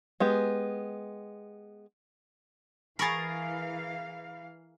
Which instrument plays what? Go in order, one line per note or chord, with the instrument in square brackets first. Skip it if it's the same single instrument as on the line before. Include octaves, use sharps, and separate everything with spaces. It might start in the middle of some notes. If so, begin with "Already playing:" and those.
[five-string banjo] G#3 B3 G4
[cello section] E3 F5 [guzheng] G#4 A#4 [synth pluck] B5 C#6 A6